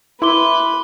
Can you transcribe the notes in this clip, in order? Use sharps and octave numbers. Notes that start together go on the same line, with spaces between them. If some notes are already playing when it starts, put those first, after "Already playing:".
E4 B4 C6 D6 G7